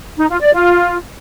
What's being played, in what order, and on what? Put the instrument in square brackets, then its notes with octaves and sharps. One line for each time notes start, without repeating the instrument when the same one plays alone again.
[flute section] D#4
F4
D5
F4